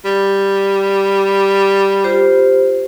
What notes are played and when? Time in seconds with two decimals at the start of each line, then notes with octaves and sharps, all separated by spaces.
0.05 G3
2.04 F4 G4 C5